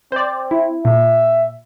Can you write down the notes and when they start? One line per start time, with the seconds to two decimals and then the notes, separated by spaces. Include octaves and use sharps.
0.12 C4 C5 D5
0.51 E4
0.85 A#2 E5